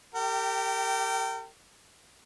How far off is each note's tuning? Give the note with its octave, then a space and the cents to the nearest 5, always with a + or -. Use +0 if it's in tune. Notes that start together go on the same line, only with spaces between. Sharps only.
G4 +0 A#4 -40 G5 -20